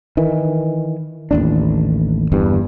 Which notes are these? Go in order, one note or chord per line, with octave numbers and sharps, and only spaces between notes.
D#3 E3
A1 D#2 D4
G1 E2 G2